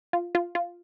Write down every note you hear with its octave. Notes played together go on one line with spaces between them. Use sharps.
F4
F4
F4